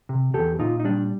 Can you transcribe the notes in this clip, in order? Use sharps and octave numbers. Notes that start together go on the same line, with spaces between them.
C3
E2 G4 A4
A#2 D#4 F4
D#4
G3 D4